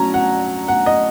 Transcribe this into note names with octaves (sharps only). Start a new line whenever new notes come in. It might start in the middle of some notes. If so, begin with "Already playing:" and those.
Already playing: F#3 C#4 A#5
F#5
F#5
D#5